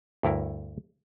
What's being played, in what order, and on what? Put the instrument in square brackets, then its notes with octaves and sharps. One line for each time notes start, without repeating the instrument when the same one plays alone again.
[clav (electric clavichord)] D2 G2 E4 A#4